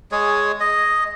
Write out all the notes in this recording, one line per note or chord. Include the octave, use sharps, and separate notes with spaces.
G#3 G#4 C#5
D#5